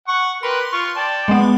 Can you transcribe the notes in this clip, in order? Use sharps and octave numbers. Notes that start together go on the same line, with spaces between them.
F#5 C#6
G4 A#4 B4 C6
F4 C#6
D5 G5 A5
G#3 B3